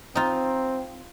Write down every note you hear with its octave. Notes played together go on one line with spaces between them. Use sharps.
C4 D#4 F4